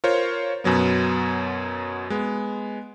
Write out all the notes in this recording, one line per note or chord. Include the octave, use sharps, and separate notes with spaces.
F4 A#4 C5 C#5
F#2 B2 F#3 B3
G#3 B3